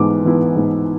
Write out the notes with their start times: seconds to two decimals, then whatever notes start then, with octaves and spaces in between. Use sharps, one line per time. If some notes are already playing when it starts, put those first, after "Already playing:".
Already playing: G#2 E3 B3 D6
0.24 E3 B3 E4
0.56 G#2